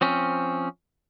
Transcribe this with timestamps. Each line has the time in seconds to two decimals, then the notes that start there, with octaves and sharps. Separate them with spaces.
0.01 F3 C4 C#4